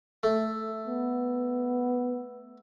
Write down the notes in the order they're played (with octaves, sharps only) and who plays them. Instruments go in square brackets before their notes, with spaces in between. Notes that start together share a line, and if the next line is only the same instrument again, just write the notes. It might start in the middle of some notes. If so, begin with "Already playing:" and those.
[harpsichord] A3
[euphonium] B3